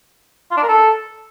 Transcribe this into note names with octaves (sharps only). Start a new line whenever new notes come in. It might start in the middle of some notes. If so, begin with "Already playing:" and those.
F4
D4
A#4
A4